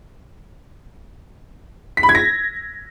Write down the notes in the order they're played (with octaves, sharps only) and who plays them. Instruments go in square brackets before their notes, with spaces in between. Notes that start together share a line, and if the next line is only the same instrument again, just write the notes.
[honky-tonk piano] B6
B5
G#6
A#6